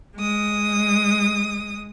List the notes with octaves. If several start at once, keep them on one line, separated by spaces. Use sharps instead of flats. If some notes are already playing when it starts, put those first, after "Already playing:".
G#3 D#6